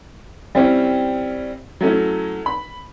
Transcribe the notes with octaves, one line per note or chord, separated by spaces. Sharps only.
G3 C4 C#4 E4
F#3 A3 C#4 E4
B5